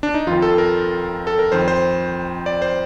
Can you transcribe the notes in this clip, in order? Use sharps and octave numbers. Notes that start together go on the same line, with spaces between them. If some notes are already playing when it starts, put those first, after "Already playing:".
D4
D#4
F2 D#3 F4
A4
A#4
A4
A#4
F2 D#3 C5
C5
D5
C5